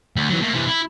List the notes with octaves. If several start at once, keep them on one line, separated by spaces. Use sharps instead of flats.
D2
E3 F#3
A3 A#3
C3 E3
E4